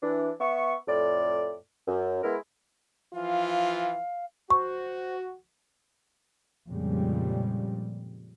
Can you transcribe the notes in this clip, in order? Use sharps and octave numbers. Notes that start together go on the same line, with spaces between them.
E3 D4
B3 E5 C#6
F2 A2 D5
F#2
G#3 B3 E4 A#4
E3 F3 F4 F5
F#4 C5 C#6
F2 A#2 C#3 G3 G#3